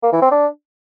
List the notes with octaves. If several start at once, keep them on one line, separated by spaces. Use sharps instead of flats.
A#3
E3
C4
D4